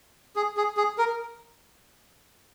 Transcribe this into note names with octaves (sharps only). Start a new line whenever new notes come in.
G#4
G#4
G#4
A#4